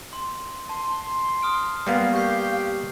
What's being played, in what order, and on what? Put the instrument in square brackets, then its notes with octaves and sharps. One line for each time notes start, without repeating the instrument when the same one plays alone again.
[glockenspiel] C6
[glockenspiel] A5 [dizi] C6
[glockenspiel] D#6 F6 D7
[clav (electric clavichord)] G3 A#3 B3 [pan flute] F5
[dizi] G4 [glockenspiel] C#6 G6 C7